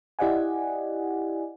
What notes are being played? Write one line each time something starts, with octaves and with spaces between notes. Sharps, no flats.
E4 G4 D5 D#5 F#5 G#5